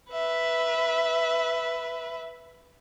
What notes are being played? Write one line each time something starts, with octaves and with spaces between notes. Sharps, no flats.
B4 E5